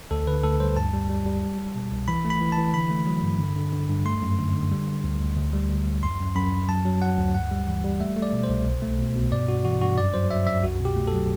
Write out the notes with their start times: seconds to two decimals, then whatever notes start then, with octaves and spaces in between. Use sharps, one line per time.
0.11 D2 A4
0.27 D3 B4
0.43 D2 A4
0.60 G3 C5
0.77 G2 A5
0.93 G3
1.10 G3
1.26 G3
1.42 G3
1.59 G3
1.75 B2
1.92 C2
2.08 E3 B5
2.25 A3
2.30 B5
2.41 E3
2.52 A5
2.57 E3
2.74 D3 B5
2.90 A3
3.07 F#3
3.23 G2
3.39 D3
3.56 D3
3.73 D3
3.89 G2
4.05 A3 C6
4.22 F#2
4.39 D3
4.55 D3
4.72 G3
4.88 D3
5.04 D2
5.21 D2
5.37 D2
5.53 G3
5.70 D2
5.86 D2
6.03 F#2 C6
6.20 F#2
6.36 F#2 B5
6.52 F#2
6.69 F#3 A5
6.85 F#3
7.02 F#3 F#5
7.18 D2
7.34 G2 F#5
7.51 G3
7.67 E3
7.84 G3
8.00 A3 E5
8.17 A3
8.22 D5
8.33 B2
8.44 C5
8.49 C2
8.66 B1
8.82 A3
8.99 B2
9.15 B2
9.32 G2 D5
9.48 G2 F#4
9.65 E3 F#4
9.81 G2 F#4
9.98 F#2 D5
10.14 F#3 C5
10.30 F#3 E5
10.46 F#2 E5
10.63 C2 F#4
10.80 B2
10.85 G4
10.96 A3
11.07 A4
11.13 F#3